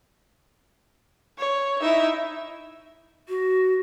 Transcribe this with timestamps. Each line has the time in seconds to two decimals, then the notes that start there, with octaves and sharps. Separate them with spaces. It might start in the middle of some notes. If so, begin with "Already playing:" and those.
1.38 C#5
1.81 D#4 E4 E5
3.28 F#4